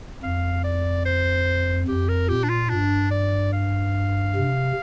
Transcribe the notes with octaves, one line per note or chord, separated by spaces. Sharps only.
F2 F5
D5
C5
F2 G4
A#4
A#2 G4
D4
F4
G2 D4
D5
F5
C3